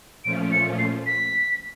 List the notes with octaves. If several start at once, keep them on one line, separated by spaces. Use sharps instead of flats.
A#2 F3 A3 C#4 F4 D7
C#7
C7
B6